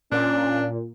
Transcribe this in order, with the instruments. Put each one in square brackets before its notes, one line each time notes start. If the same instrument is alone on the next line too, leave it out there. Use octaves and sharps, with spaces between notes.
[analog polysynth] A#2 [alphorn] C#4 [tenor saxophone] D4